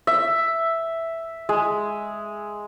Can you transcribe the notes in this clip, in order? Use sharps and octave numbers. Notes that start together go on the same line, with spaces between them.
E5
G#3